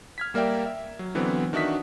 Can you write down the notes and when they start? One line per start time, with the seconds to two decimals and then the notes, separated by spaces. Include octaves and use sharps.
0.18 F6 G#6 B6
0.34 G3 A#3 A#4 D5 E5 G5
0.66 E5
0.99 F#3
1.15 D3 E3 F#3 B3 C4
1.53 D#3 D4 F#4 E5 D#6 B6